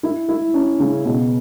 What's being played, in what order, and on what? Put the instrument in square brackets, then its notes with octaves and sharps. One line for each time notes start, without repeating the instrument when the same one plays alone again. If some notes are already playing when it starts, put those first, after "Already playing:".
[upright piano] E4
E4
C#4
C#3
B2